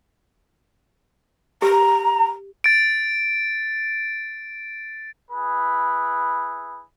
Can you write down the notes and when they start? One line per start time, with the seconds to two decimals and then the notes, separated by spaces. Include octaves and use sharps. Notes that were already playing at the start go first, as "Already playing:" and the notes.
1.62 G4 A#5
2.64 A6 D7
5.31 E4 G#4 B4